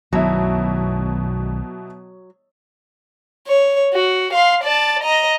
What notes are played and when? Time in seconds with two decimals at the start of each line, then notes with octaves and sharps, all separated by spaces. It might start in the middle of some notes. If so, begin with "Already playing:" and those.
0.13 B1 B2 D#3 F#3 E4
3.48 C#5
3.94 F#4
4.33 F5 C6
4.64 D5 A5
5.04 D#5 A#5